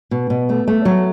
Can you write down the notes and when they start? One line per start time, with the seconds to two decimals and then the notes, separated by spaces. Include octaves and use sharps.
0.11 B2
0.30 B2
0.49 A3
0.68 A3
0.85 F#3